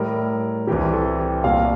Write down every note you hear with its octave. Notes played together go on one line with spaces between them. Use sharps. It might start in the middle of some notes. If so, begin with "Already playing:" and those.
Already playing: A2 G3 A#4
C2 C3 E3 G3 G4
G4
A4
G4
C2 A#2 G3 F5